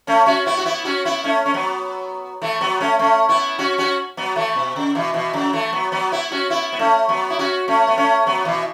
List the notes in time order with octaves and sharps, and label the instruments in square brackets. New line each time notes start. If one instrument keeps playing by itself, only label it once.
[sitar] A3 C#4
C#4 F#4
B3 E4
F#4
B3 E4
C#4 F#4
B3 E4
A3 C#4
C#4
F#3 B3
E3 A3
F#3 B3
A3 C#4
A3 C#4
B3 E4
C#4 F#4
C#4 F#4
F#3 B3
E3 A3
B2
C#3
B2 E3
B2 E3
C#3 F#3
E3 A3
F#3 B3
F#3 B3
B3 E4
C#4 F#4
B3 E4
B3
A3 C#4
F#3 B3
E4
C#4 F#4
A3 C#4
B3
A3 C#4
F#3 B3
B2 E3